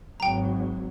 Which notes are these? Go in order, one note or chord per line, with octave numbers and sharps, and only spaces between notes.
G#1 F#3 G5 A#5